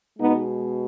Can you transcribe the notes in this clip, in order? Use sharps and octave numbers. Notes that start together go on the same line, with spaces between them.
B2 G#3 B3 D#4